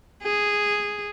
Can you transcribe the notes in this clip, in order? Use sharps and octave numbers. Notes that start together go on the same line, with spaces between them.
G#4